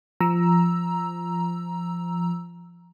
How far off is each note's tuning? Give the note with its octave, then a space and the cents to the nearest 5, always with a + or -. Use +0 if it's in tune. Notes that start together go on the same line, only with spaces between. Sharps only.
F3 -10 A#5 +10 E6 +0